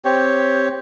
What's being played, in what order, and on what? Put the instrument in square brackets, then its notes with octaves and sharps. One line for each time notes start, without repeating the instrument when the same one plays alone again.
[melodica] C4 G4 C#5